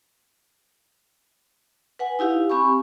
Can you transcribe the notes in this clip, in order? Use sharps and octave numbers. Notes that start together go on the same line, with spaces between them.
B4 F#5 G#5
D#4 E4 G4 F5
C4 G4 G#5 B5 C#6